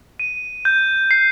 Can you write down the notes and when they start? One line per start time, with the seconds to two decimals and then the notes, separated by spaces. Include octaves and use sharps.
0.20 D#7
0.65 G6
1.11 C7